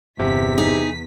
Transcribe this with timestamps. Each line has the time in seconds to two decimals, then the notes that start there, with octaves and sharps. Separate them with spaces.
0.19 G1 E2 C3 B6
0.58 D#4 G#4